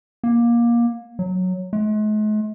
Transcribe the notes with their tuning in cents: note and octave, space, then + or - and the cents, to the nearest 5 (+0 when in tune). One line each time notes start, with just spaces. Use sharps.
A#3 +20
F#3 -5
G#3 +45